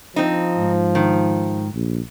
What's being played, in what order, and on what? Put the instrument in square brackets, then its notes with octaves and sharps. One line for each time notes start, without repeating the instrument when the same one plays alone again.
[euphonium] F3 [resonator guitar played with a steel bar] C4 D#4
[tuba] G#2
[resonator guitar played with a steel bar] D#3
[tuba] A#1